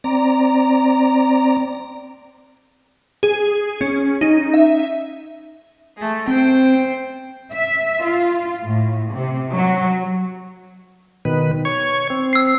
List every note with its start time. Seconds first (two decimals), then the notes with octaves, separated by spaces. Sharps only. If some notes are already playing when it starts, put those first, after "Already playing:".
0.04 C4 D5 A#5
3.23 G#4
3.81 C#4
4.21 D#4
4.54 E5
5.97 G#3 A3
6.28 C4 C5 G5
7.52 E5
8.02 F4
8.62 A2
9.12 C3
9.53 F#3
11.25 B2 D#3 B4
11.65 C#5 C#6 G#6
12.10 C4
12.33 E6 C7